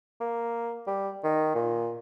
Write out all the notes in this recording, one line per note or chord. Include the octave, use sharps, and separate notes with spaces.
A#3
G3
D#3
A#2